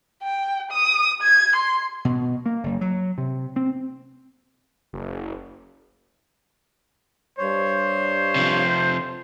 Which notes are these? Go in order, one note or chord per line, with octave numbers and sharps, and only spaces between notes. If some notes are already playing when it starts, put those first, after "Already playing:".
G5
D#6
G#6
C6
B2
A#3
F#1
F#3
C3
C4
F#1
G2 C5 C#5
C3 F3